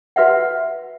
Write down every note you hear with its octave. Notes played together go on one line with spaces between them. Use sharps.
F#4 B4 E5 F#5